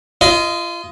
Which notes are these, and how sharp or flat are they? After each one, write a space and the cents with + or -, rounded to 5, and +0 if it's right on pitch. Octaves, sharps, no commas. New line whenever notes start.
F4 -30 D#5 +10